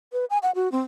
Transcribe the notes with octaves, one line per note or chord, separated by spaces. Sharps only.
B4
G#5
F#5
F#4
C4